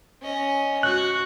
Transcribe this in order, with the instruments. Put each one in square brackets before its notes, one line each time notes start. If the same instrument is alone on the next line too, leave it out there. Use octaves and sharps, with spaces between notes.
[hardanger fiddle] C#4 D#5
[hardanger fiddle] F#4 [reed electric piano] F#6